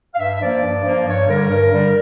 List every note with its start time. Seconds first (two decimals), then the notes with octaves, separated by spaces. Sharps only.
0.14 F5
0.19 G2 E5
0.35 E5
0.41 F3 A#3 D5
0.63 G2
0.85 F3 A#3
1.07 G2 C#5
1.28 D3 G3 A#4
1.50 G2
1.71 D3 G3